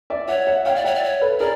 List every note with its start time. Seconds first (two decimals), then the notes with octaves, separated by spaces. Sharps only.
0.10 D5 E5
0.28 C#5 E5 F#5
0.47 E5 F#5
0.66 C#5 F5 G5
0.75 D5
0.84 C#5 E5 F#5
0.95 D5
1.04 C#5
1.21 A4 B4
1.40 G#4 A#4 D5